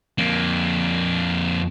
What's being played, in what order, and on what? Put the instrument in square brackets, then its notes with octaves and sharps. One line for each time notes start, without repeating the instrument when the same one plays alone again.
[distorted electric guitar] F2 A#3